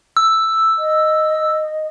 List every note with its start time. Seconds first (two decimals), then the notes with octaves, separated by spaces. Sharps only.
0.17 E6
0.78 D#5